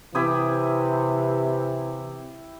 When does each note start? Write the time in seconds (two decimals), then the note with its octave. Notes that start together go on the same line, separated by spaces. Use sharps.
0.15 C3 E3 E4 G4 D#6